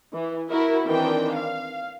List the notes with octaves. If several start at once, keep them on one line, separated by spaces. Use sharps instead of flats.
E3
E4 F#4 A#4
D#3 E3 C4 D4 G5
F5